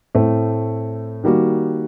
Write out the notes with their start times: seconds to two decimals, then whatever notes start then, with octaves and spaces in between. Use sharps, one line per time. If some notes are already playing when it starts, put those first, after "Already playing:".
0.15 A2 A3 C4
1.24 D#3 G3 A#3 F#4